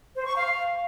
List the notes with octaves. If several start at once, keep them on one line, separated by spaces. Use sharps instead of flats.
C5
C#6
F5